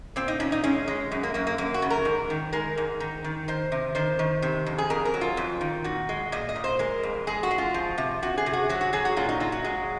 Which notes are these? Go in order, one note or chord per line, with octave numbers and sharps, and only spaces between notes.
A#2 C4
D#4
A#2 C#4
D#4
G#3 C#4
G#3
F#2
A#3
F#2 A#3
A#3
F#2 A#3
F#4
C#3
A#4
G#2
D#3
G#3 A#4
G#2
D#3
D#3
D#3 C5
C3
D#3 C5
D#3
C3
F2
G#4
F2 A#4
A#4
F#3
F4
F2
D#3
A#2 F#4
G#3
A#2 D#5
D#5
A#2
C5
G#3 A#4
F2
G#3 G#4
F#4
G#3
F4
F3
C3
C3 F#4
G#4
C3
F#4
F#3 F#4
F#4
F#3 G#4
F#4
A#2 F4
D#4
F#3 F4
F#4
G#3